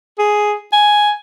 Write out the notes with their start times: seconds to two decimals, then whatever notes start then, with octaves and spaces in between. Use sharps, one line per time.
0.19 G#4
0.73 G#5